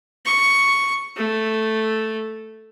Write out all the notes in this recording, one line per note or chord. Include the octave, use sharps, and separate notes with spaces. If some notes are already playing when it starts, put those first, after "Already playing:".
C#6
A3